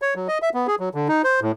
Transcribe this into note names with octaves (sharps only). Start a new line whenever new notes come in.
C#5
F#3
D#5
E5
B3
G#4
F#3
D3
D#4
C5
A2